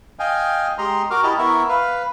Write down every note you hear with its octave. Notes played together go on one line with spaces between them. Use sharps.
D#5 F5 G5 G#5
G#3 G4 D#5 A#5 C6
F#4 A#4 D6 F6
E4 G4 D#5 A5 A#5
B3 E4 A#4 E5 C#6
B4 F5